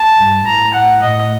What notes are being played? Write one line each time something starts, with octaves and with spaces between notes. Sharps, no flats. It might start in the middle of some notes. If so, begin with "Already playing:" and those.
Already playing: A5
G2
A2 A#5
F#5
A2 D#5